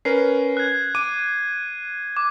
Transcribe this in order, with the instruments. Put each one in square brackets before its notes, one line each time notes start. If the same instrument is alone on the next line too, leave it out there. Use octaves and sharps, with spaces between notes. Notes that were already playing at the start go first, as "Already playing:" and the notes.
[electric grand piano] C#4 A#4 B4 [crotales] C7
[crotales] F#6 G#6
[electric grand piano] D6 [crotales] D#7
[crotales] D6